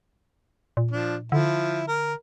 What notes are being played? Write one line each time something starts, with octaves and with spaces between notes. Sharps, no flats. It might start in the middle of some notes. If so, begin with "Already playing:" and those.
A#2
F3 D4
D3 F3 E4
A#4